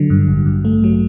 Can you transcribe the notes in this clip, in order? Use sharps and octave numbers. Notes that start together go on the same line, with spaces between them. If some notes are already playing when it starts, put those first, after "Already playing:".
Already playing: D3 F#3
G2
A1
G2
A3
F#3